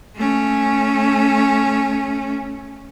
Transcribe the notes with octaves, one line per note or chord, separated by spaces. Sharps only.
A3 C#4